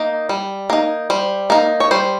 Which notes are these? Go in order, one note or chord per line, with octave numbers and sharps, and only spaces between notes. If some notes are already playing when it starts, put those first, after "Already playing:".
Already playing: A#3 D#4
G3
A#3 D#4
G3 C5
A#3 D#4
C#5
G3 C5